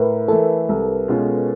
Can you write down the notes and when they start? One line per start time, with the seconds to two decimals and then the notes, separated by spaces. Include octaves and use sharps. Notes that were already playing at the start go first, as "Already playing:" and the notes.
Already playing: A2 A#4 B4
0.28 E3 A3 A4
0.69 C2
1.08 B2 G#3 C#4 F4